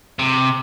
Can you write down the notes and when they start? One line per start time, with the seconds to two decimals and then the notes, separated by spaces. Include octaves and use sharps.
0.19 C3